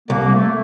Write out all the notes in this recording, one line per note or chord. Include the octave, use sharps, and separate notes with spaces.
C2 A#3
A3